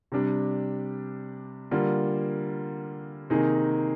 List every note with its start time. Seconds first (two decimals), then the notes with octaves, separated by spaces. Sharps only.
0.12 C3 G3 D4
1.71 D3 G3 A#3 F4
3.30 C3 D#3 A#3 D#4 G#4